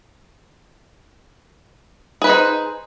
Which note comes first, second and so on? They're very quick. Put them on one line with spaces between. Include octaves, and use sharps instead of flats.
G#4 B4 C5 D#4